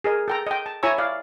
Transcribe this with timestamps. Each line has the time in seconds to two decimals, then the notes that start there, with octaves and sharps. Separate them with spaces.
0.04 G#4 A#4 D#5
0.28 A4 G5 A#5
0.47 D#5 G5
0.66 A5
0.83 E4 C#5 G#5 A#5 C#6 E6
0.98 D5 F5